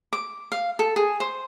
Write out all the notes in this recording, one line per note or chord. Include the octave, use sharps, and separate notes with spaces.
D6
F5
A4
G#4
C5